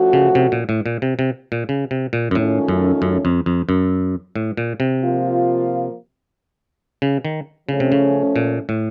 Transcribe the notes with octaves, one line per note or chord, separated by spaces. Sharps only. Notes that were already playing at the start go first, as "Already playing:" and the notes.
Already playing: F3 A3 C#4 F#4
C#3
C3
A#2
A2
A#2
C3
C3
A#2
C#3
C3
A#2
F#2
A2 D#3 A3 C#4 F4
F#2
F#2
F2
F2
F#2
A2
A#2
C3
F3 A#3 F4
C#3
D#3
C#3 F3 A3 C#4
C3
C#3
A#2
A2